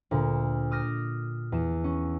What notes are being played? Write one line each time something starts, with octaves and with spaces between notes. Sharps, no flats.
D2 A#2
D6 D#6 F6 G6 A#6
E2 E7
C#4